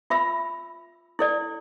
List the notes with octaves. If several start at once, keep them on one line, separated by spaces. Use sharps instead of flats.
F4 E5 B5 E6
E4 A4 D5